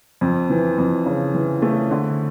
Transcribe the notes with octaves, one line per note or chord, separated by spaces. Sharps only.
F2
E3
F2
C#3
E3
A3
D3